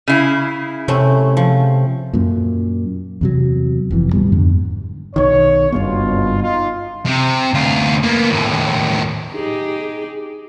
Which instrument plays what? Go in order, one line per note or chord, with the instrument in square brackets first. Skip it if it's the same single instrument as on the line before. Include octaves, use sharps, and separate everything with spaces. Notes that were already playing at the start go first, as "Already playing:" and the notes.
[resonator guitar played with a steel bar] C#3 E4
[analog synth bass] C3 [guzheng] A3 C4 C#4
[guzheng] F3
[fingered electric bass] F#2 A#2
E2 C3 F#3
F1 F2 E3
D#2 A2 G3 B3
F2 G#2 D3
[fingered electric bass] B1 D#3 [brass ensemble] C#5
[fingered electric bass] F#1 G2 B3 [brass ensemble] B2 G#3 F4
[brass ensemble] D#4 F4
[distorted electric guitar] C3
D2 F4
A#3 B3
D#2 A2
[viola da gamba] D#4 G4 G#4